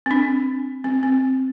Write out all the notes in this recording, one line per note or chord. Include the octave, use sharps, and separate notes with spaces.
C4
D4
C4
C4